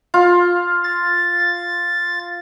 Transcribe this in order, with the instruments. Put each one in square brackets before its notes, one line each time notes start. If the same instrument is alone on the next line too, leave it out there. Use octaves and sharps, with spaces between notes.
[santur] F4
[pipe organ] A6